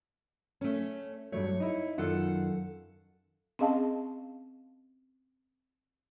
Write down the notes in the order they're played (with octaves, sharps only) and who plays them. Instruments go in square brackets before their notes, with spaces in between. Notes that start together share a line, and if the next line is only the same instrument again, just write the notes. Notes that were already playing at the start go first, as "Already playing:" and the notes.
[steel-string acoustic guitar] A3 C#4
[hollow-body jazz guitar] G2 F#3 A3 [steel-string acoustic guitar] C#5
[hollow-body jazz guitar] D#4 E4
[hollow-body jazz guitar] F#2 D#3 F4 [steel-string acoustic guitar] A4 F5 F#5
[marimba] C4 C#4 G#4 D#5 F5 A5